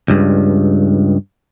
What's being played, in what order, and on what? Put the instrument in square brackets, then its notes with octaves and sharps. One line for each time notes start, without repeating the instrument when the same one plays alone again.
[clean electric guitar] C#2 G2